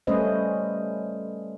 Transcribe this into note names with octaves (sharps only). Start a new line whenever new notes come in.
G3 A3 C#4 B4 C5 D#5